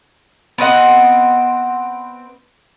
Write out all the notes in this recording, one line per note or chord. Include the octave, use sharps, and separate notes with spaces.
B3 C4 D#5 F#5